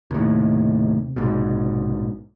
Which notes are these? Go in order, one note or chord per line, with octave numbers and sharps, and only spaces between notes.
D#2 A2 C3
A#1 G#2 B2